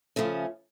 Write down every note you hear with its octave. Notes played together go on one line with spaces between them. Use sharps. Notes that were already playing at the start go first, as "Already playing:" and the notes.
C#3 F3 A3 C#4